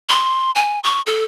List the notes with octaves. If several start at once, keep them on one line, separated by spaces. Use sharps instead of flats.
C6
G#5
C#6
A4